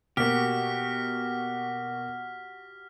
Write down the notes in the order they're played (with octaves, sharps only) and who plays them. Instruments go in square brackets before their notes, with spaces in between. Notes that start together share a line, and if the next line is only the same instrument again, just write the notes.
[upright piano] B2 A#3 [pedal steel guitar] F#4 G4 [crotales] F6 B6